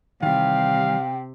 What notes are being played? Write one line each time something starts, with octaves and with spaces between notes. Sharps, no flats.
C3 D#3 E3 G3 F5 G5